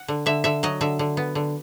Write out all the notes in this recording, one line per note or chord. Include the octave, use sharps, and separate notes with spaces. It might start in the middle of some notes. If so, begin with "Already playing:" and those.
Already playing: F#5
D3
D3 E5
D3 E5
F#3 D#5
D3 E5
D3
B3
D3